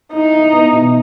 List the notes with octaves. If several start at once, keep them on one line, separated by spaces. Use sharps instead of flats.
D#4 E4
E4
B3
B2